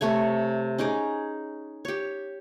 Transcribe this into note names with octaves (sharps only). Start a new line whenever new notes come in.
C3 A3 C#5 G#5
C#4 D#4 G#4 D6
G4 C#5